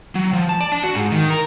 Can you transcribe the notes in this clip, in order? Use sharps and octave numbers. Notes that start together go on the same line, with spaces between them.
F#3
F3
A5
D5
D4
F#4
G#2
D#3
A#4